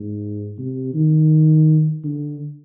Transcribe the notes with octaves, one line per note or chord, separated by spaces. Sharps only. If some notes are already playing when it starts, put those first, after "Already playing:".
Already playing: G#2
C3
D#3
D3